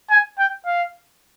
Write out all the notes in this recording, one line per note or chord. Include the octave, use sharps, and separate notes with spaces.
G#5
G5
F5